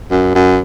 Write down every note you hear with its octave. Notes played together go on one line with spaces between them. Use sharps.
F#2
F#2